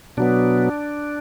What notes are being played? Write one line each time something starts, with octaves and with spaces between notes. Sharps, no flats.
B2 F#3 B3 D4